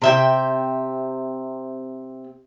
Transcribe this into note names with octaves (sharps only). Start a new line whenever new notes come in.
C3 E5 G5